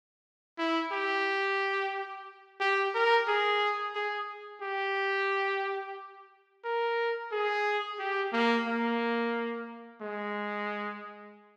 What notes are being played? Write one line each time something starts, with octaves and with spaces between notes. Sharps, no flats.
E4
G4
G4
A#4
G#4
G#4
G4
A#4
G#4
G4
A#3
A#3
G#3